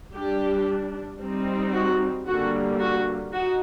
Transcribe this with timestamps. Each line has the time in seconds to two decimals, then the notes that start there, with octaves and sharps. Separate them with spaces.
0.13 G3 D4 G4
1.20 G3 C4 D#4
1.73 F#4
2.27 D3 G3 A#3 F#4
2.79 F#4
3.32 D#4 F#4